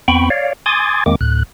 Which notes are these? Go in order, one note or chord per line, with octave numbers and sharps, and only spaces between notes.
E2 B3 C4 G5 B5 C#6
C#5 D5 F5
G#5 C6 D6 D#6 G#6 A6
E2 D#3 G#3 A#3 C4 D6
D2 A2 F#6